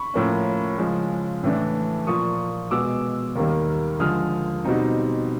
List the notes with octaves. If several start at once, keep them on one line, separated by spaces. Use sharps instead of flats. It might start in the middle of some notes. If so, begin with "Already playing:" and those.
Already playing: B5 C#6
A2 F3 A#3 C#4
C#3 F3 G#3 C#4
A2 E3 A3 D4
A#2 F3 A#3 C#6 D#6
B2 G#3 B3 D6 E6
D#2 D#3 G3 A#3
D3 F3 G#3 D#6 F6
B2 G3 C4 D#4